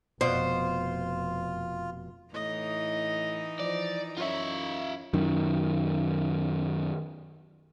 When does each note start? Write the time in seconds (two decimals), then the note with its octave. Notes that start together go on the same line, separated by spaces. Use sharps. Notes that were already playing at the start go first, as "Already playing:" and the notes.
0.21 F1 B2 F4 C5
2.34 A2 E3 D#4 D#5
3.60 F3 D5
4.17 F#2 F4 C#5 E5
5.14 F#2 D#3